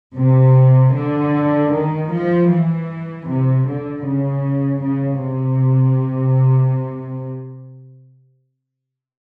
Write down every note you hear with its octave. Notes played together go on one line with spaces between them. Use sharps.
C3
D3
D#3
F3
E3
C3
D3
C#3
C#3
C3